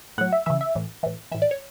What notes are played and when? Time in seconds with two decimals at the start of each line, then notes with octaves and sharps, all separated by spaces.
0.18 A2 F#3 F#5
0.32 E5
0.46 C#3 E3 E5
0.61 E5
0.75 A2 E3
1.03 A2 E3
1.32 A2 E3 E5
1.42 D5
1.51 C#5